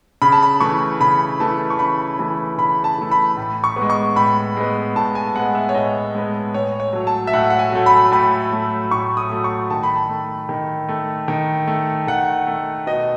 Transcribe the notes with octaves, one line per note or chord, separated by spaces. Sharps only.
C#3 B5
A5
B5
E3 A3 C#6
C#3 B5
E3 A3 A5
C#6
C#3 B5
E3 A3
C#3 B5
A5
E3 A3
B5
A2
C#6
B3
G#3
C#6
A2 B5
G#3 B3
A2 A5
G#5
G#3 B3 F#5
E5
C#5
A2 D#5
G#3 B3
A2 C#5
C#5
F#3 A3
A5
E5
A2 F#5
F#5
G#5
F#3 A3
B5
A2 B5
F#3 A3
A2 C#6
D#6
F#3 A3
C#6
D#3 A5
B5
A5
A3
D#3
A3
D#3
A3
D#3 F#5
A3
B2 D#5